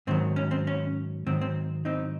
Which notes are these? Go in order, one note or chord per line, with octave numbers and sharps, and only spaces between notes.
G#2 D#3 F#3 C4
C#4
C4
C#4
G#2 D#3 F#3 C4
C4
C4 D#4